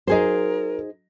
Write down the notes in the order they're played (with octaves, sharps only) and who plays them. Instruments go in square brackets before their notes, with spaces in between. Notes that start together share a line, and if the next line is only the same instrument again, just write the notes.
[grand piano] F#3 D#5 [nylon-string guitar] D#4 G#4 C5 [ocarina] A#4